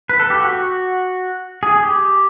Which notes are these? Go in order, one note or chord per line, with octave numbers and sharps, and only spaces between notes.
B4
A4
G4
F#4
G#4
G4